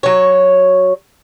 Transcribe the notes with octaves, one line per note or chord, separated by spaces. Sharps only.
F#3 C#5